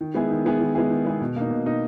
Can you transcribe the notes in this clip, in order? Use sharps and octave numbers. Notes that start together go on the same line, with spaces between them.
D#3
G#3 B3 E4 G#4
D#3
G#3 B3 E4 G#4
D#3
G#3 B3 E4 G#4
D#3
G#3 B3 E4 G#4
B2
A#3 D#4
B2
A#3 D#4